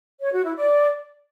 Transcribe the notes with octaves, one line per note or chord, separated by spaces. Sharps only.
C#5
F#4
E4
D5